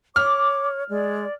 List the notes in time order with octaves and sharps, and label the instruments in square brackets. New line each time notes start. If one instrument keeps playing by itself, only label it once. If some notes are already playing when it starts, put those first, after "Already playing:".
[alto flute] C#5 [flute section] D6 [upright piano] F6
[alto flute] G#3 [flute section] D5